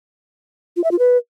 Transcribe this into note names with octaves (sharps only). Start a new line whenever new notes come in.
F4
E5
F4
B4